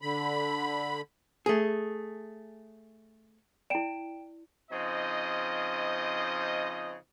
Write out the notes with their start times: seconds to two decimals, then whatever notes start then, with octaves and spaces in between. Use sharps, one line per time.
0.02 D3 B5
1.46 A3 G#4
3.70 E4 D5 G5 D7 E7
4.71 C#3 F3 C4 D#4 D#5